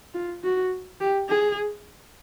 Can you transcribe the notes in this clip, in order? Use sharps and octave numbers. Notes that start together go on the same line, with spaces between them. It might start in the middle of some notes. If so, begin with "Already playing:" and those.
F4
F#4
G4
G#4